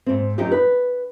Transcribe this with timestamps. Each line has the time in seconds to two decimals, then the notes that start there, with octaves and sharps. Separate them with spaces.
0.06 G#2 C4
0.38 F#2 D#4 G4
0.52 B4